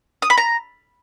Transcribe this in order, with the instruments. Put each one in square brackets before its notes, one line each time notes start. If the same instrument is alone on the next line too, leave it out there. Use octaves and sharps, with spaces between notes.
[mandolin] D#6
B5
A#5